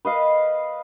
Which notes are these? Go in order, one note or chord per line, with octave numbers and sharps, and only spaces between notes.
B4 D#5 F5